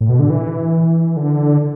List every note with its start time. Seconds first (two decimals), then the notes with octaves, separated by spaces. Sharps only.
0.01 A2
0.09 B2
0.19 D3
0.30 E3
1.17 D3